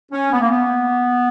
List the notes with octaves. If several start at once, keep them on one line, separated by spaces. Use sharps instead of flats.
C#4
B3
A#3
B3